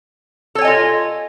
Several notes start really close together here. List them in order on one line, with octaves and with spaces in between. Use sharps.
A4 C#5 G#5 D#5 F4